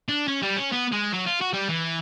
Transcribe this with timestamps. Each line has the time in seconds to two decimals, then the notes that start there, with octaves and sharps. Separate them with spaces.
0.09 D4
0.28 C#4
0.43 G3
0.57 C#4
0.72 B3
0.92 G#3
1.13 F#3
1.26 F4
1.41 F#4
1.54 G3
1.69 E3